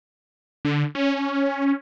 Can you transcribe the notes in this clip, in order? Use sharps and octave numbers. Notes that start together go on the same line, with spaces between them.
D3
C#4